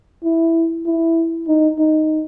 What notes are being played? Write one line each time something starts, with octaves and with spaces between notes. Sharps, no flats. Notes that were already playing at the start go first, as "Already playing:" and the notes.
E4
E4
D#4
D#4